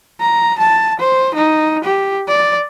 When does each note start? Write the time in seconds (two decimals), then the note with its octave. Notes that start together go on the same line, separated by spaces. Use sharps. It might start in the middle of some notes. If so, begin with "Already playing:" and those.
0.21 A#5
0.59 A5
1.00 C5
1.35 D#4
1.84 G4
2.28 D5